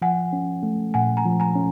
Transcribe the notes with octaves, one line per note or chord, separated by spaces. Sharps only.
F3 F#5 G#5
C#4
A3
A#2 F#5 G#5
G#5 A#5
F3
G#5 A#5
C#4